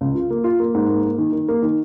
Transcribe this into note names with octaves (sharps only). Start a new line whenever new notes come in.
C#2
F4
A#3
F4
A#3
G#2
A#3
A#3
D#3
D#3
A#3
D#3